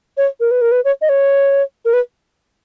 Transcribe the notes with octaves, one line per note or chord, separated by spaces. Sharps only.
C#5
A#4
B4
A#4
B4
C#5
D#5
C#5
A#4
B4